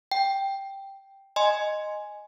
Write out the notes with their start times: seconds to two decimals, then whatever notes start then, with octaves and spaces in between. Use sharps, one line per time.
0.12 G5
1.36 D#5 G#5 C6